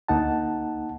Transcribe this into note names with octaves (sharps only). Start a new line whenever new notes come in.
D2 A#3 D#4 F#5 A5